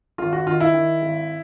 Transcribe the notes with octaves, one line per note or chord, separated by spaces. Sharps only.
G#1 F4
F#4
D#3 F4
E4
D#3
G#1